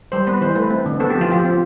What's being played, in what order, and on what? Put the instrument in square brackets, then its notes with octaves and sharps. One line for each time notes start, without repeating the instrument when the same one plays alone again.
[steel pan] G3 C5
B3 B4
E3 C5
A3 B4
C4
D3
B3 A4
G4
F3
F4
F3 G4
C4